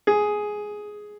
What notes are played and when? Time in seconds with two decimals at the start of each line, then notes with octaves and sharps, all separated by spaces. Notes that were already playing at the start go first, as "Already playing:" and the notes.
0.07 G#4